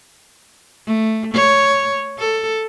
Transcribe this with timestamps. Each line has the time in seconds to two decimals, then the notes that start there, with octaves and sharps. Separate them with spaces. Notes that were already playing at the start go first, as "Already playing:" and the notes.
0.86 A3
1.35 C#5
2.19 A4